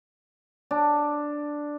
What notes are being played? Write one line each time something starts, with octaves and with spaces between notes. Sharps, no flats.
D4